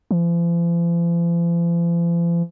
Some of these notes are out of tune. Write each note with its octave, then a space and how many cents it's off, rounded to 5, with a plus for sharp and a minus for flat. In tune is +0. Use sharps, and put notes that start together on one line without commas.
F3 -45